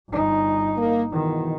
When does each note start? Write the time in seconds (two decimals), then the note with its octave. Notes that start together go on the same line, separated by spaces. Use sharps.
0.10 G1 D#4
0.77 A#3
1.11 E2 B2 D#3 E3